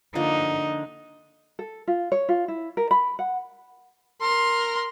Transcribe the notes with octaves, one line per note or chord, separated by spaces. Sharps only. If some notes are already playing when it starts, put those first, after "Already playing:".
D3 F3 A#3 D#4
A4
F4
C#5
F4
E4
A#4
B5
F#5
A#4 C6